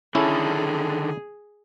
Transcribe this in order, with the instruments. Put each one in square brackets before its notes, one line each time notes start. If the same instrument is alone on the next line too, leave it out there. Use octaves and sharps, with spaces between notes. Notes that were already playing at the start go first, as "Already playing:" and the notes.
[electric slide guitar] D3 D#3 A4 [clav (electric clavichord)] C#4 E4 [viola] G#4